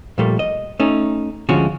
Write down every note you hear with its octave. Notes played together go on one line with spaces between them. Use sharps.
A#2 F3 G3 A3 A#3
D#5
A3 C#4 D#4
D2 D3 F3 G#3 C#4 F#4